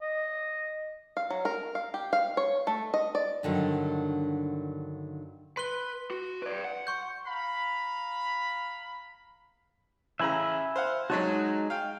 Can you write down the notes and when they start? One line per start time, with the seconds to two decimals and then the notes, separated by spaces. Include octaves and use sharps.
0.01 D#5
1.17 F5
1.30 F#3
1.45 A#4
1.75 F5
1.94 G4
2.13 F5
2.37 C#5
2.67 A3
2.94 D#5
3.15 D5
3.43 G2 D3 D#3 F#3
5.57 B4 C6 F#6 G7
6.10 F#4
6.42 B4 D5
6.65 F#5
6.87 C6 C#6 G6
7.26 F5 A#5 B5
10.19 A1 C#3 E5 G#5 A#5 B5
10.76 C5 F5 F#5
11.10 F#3 G#3 D#4 F#4 C#5 A5
11.70 F5 G5